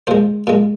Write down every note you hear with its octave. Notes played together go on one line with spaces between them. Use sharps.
A#2 G#3 C5
A#2 G#3